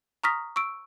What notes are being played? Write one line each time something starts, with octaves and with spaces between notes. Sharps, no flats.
A#5 C#6 D#6 F6 A#6 B6
C#6 E6 D7